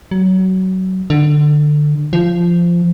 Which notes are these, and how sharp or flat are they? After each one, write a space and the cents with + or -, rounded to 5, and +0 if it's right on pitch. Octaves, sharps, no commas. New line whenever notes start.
F#3 +20
D3 +20
F3 -15